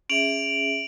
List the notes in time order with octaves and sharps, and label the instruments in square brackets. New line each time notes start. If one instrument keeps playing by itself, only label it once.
[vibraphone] C#4 G#4 E5 [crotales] D7 F7 F#7